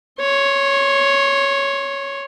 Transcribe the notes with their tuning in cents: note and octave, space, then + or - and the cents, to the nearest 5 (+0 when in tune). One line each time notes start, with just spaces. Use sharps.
C#5 +0 C6 +40